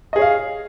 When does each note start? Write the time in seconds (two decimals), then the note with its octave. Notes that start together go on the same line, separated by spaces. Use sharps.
0.13 D#5
0.16 G#4
0.19 C#5
0.22 F5